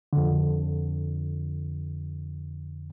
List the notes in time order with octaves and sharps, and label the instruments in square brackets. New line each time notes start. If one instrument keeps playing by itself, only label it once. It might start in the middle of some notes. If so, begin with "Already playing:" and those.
[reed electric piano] F2 D3